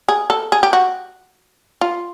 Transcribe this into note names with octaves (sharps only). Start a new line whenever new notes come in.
G#4
A4
G#4
G4
F#4
F4